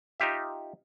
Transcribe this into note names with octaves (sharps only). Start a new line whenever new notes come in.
D#4 F4 G4 E5